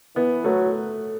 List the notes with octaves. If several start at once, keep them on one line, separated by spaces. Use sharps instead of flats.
E3 B3
F#3 A3